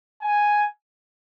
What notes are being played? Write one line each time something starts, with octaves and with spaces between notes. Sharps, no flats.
G#5